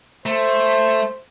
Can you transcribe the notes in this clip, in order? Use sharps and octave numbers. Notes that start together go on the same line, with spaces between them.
A3 C5